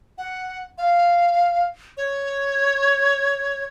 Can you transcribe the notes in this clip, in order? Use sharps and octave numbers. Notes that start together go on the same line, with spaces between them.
F#5
F5
C#5